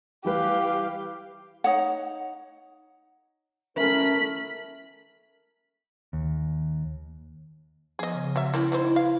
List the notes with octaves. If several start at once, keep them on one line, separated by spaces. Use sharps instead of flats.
E3 G3 G4 B4 F5
D#4 C#5 F#5
A3 C#4 A#4 B5
D#2
F3 B3 G#4 D#5
C#3
F#3 E5
A#3 C4 C#4 E4
B3 D#4 C5
F5